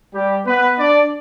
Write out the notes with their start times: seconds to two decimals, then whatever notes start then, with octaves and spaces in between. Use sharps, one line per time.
0.14 G3 G4
0.46 B3 B4
0.77 D4 D5